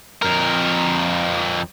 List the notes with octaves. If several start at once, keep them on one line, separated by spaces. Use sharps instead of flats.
F2 A#4